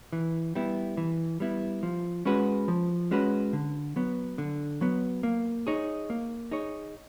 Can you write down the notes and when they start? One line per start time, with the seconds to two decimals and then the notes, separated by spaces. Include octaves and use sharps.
0.13 E3
0.55 G3 B3 E4
0.97 E3
1.40 G3 B3 E4
1.83 F3
2.25 G#3 C#4 F#4 B4
2.68 F3
3.11 G#3 C#4 F#4 B4
3.53 D3
3.96 F#3 B3
4.38 D3
4.81 F#3 B3
5.23 A#3
5.67 D#4 G#4 C#5
6.10 A#3
6.51 D#4 G#4 C#5